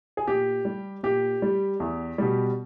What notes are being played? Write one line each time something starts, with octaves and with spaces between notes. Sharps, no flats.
G#4
A#2 G4
G3
A#2 G4
G3
E2
B2 G3